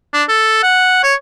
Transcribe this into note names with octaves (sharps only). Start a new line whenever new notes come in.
D4
A4
F#5
C#5